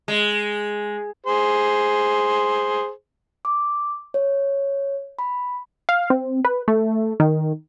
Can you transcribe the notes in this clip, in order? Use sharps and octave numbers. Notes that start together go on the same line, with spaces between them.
G#3
G#4 C5
D6
C#5
B5
F5
C4
B4
A3
D#3